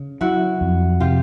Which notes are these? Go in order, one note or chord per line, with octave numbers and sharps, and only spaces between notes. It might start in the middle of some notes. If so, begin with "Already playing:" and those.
Already playing: C#3
F#3 E4 F#4
F2
C3 F4 G4